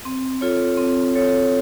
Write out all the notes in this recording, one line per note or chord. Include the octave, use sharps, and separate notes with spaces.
C4
F4 A4 C#5
C4
F4 A4 C#5